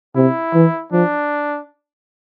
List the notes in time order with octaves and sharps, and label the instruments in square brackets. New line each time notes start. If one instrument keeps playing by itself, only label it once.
[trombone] C3 [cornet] E4
[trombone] E3
[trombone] F3 [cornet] D4